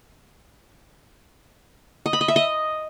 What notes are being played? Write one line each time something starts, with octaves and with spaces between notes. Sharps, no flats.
D#5
B5
D#5
E5
D#5